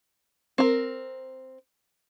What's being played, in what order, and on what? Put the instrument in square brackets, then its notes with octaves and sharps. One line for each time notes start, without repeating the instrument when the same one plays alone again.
[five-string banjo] C4 A#4